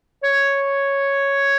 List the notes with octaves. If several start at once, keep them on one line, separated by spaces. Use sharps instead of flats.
C#5